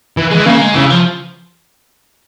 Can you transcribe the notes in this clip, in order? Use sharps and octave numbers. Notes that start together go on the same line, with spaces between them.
E3
E3 G#3
C#3 A#3
G#3
C#3 E3
F3